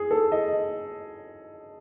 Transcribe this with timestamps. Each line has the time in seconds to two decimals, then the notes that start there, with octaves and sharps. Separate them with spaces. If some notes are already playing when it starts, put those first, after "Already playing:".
Already playing: G#4
0.11 A4
0.32 D#5